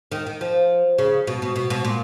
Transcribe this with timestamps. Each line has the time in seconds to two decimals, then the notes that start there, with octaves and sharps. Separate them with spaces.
0.12 D#3
0.26 D#3
0.41 F3
0.98 C#3
1.27 B2
1.42 B2
1.56 B2
1.70 B2
1.84 A#2